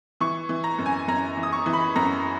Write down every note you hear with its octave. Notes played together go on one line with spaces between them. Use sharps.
E3 C#6
E3
A#5
F#2
G#5
F#2 A#5
E3
D#6
C#6
E3
B5
F#2 A#5